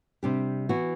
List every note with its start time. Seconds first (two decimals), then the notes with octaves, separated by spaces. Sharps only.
0.23 C3 G3 D4 G4
0.69 E3 B3 F#4